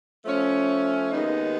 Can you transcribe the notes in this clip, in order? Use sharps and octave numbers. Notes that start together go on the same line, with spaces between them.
F3 A3 C#4
D#2 D#3 G#3 B3 D#4